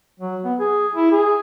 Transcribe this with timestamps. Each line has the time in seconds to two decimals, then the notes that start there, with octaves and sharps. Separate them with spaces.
0.20 F#3
0.44 B3
0.60 G#4
0.95 E4
1.12 G#4